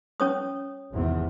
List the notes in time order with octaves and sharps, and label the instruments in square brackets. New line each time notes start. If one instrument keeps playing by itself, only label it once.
[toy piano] C#4 C#5 D#6
[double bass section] G#1 E2 C3